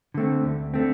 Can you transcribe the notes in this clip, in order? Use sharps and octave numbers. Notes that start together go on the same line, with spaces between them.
D3 A3 C4
D2
D3 A3 C4